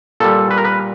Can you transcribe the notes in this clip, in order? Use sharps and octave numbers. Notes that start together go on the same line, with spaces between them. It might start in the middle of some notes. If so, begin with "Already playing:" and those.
A#2 G3 A4
B4
A#4
B4